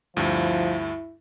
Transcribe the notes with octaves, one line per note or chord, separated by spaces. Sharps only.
D2 G2 F3 E4